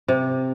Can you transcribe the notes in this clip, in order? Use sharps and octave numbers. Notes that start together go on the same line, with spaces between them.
C3